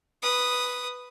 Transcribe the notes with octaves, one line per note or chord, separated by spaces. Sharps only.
B4 D#6